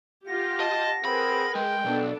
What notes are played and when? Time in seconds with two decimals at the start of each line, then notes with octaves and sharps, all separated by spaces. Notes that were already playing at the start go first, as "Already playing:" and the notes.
0.27 F4 G4 F#5 A#6
0.60 D#5 A5
1.05 C4 G#4 A#4 B4 B5
1.55 G#3 G5
1.86 B1 B3 D4 A4